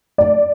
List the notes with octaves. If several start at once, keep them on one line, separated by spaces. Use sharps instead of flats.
D5